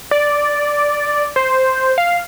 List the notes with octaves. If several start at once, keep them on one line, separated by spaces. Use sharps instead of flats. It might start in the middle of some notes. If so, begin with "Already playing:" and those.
D5
C5
F5